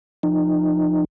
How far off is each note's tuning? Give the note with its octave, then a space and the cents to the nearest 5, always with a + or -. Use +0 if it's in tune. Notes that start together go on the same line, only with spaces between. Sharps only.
F3 +5 D#4 -25